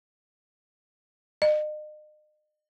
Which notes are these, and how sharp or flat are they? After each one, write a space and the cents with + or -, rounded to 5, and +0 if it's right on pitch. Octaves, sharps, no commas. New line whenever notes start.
D#5 -40